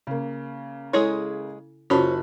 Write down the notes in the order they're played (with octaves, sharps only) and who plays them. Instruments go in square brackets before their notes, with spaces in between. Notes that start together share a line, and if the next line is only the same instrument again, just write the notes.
[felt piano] C#3 A#3
[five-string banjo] G#3 G#4 C#5 [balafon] E4 A4
[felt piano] F#1 A5 B5 [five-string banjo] C#4 C5 [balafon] F4 F#4